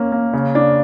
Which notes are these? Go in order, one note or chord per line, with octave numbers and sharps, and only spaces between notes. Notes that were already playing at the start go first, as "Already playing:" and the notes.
Already playing: A#3 C#4
A#3
C#3
D4